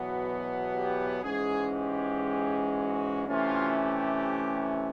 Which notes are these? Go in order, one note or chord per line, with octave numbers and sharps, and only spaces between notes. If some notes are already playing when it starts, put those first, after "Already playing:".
Already playing: E2 B2 F#3 B3 F#4
G4
G#2 E3 G#3 C#4 G#4
G4
F#4
C3 E3 A3 C#4 F4
G4